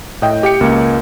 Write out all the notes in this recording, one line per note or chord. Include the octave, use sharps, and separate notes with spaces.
A2 D#5 G5
G4 G5 C#7
C#2 A#3